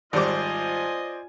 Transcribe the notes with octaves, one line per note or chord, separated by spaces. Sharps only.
G#1 G3 F4 C5 D5 D#5 G#5 D6